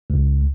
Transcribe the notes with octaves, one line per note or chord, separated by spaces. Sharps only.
C#2